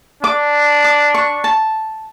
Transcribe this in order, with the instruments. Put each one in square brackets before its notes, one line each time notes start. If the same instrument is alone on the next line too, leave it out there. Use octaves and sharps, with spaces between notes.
[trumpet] D4 [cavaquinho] D6
[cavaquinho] D6
C#6
A5